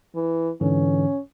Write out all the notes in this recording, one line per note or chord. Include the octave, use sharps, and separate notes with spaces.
E3
G#2 D3 E3 C#4